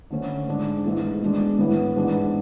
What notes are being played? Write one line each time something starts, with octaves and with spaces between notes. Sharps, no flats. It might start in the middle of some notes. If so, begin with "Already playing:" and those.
D3 A3 C#4
G#2 G#3 D4
G#2 E3 A3 E4
B2 G#3 D4
A2 E3 B3
G#2 E3 B3 D4